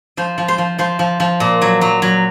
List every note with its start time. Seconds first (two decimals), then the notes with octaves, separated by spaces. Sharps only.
0.17 F3 C5
0.38 F3
0.48 C5
0.58 F3
0.79 F3 C5
0.99 F3
1.20 F3
1.40 A#2
1.62 F#3
1.81 F#3
2.02 F#3